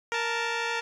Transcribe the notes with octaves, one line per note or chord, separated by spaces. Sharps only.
A#4 A5